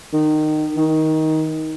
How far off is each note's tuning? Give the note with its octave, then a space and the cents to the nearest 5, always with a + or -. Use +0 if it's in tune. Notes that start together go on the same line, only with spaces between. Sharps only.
D#3 -20
D#3 +15